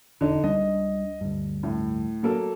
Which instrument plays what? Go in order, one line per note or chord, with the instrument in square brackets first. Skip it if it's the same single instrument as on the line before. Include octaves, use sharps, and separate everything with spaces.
[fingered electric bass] E1 [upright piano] D3 D#4
[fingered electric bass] C#2 G3 D4 [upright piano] D#5
[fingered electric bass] D2 G2
[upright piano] A2
F#3 A#3 A4